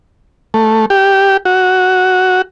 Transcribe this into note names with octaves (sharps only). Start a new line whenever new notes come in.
A3
G4
F#4